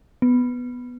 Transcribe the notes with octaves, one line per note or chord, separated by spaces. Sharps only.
B3